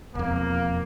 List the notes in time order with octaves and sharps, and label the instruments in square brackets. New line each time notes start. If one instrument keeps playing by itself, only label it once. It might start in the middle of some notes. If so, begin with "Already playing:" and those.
[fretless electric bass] E1 F2 [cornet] A#3